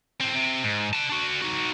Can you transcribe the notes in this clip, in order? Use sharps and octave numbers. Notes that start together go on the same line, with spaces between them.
A2 C4
C3
G#2
F#5 A5
D4 F#4
D#4 F#4